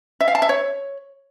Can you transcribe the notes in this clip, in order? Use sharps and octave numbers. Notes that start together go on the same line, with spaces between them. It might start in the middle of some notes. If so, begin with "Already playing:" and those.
E5
F5
A5
E5
C#5